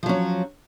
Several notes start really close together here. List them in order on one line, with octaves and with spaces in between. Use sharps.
F3 F#3 C#4